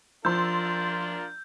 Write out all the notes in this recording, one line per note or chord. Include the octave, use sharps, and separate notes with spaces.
F3 D4 F4 A#4 C6 E6 G6